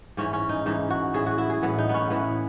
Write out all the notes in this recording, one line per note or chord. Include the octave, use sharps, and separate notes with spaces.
G#2 E3 C#4
C#4
D#4
G#2 E3 D#4
F#4
A2 E3 G#4
F#4
E4
G#4
A2 E3 B3
D#4
B3 C#4
A2 E3 B3